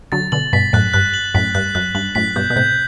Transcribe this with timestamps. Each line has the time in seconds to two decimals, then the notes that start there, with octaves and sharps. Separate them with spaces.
0.12 D3 F#3 A6
0.32 B2 D3 F#7
0.53 G2 B2 B6
0.73 F#2 A2 F#6
0.93 G2 F#6
1.14 F#7
1.35 F#2 A2 B6
1.55 G2 F#6
1.75 F#2 F#6
1.95 G2 F#7
2.15 F#2 A2 B6
2.36 G2 B2 G6
2.50 B2
2.56 A2 C3 G6